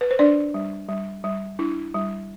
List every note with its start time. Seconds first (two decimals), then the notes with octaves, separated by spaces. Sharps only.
0.01 B4
0.11 C5
0.19 D4 D5
0.54 G3
0.89 G3
1.24 G3
1.59 D4 E4
1.94 G3